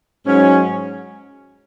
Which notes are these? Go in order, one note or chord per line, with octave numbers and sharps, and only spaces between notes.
G#2 F#3 C#4